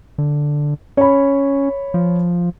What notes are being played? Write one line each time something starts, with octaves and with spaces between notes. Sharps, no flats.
D3
C#4 C#5 B5
F3